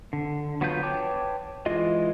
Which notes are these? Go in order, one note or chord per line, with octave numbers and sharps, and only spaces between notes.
D3
F#3 B3 F4 B4 G6
B4 C#5 G5 A5 D6
E3 G#3 F4 D#5